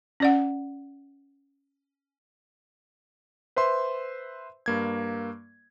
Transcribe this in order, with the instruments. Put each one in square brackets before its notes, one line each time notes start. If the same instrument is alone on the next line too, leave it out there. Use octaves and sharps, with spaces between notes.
[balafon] C#4 D5 F#5
[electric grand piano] B4 C5 E5 C6
G2 A#3 G#6